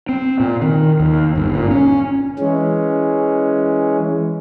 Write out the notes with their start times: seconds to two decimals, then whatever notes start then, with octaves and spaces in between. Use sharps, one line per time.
0.09 C4
0.40 A#2
0.62 D#3
1.00 D#2
1.36 G1
1.55 A#2
1.71 C#4
2.39 E3 G#3 C#4